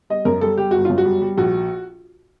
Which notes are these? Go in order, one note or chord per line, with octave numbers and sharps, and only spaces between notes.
G3 D#5
F#2 A#4
G3 A4
G3 G4
G1 F#4
F#2 F4
F#4
G3
G3
A#1 F#4